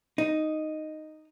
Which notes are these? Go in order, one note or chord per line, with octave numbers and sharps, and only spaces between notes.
D#4